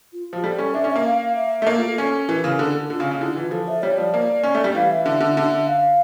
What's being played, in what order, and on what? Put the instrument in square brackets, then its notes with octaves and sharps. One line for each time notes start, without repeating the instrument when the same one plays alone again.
[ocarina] F4
[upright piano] F3
[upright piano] G3 [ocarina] A4
[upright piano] C#4
[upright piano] D4 [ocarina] E5
[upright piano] C#4
[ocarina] E5
[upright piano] A#3
[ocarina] F5
F5
E5
[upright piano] A3
A#3
[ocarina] F4
A4
[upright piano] C#4
[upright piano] E3 [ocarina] A#4
[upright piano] C#3 [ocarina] A#4
[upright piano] D3 [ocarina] A4
[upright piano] D3 [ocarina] F4
[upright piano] C#3
C#3
[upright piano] D3 [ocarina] E4
[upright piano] E3 [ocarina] F4
[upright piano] F3 [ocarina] A4
[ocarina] E5
[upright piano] G3 [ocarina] C#5
[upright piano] F3 [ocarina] D5
[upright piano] A#3
C#4
A3
G3
[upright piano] E3 [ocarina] F5
[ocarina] E5
[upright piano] D3
D3
D3
[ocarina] F5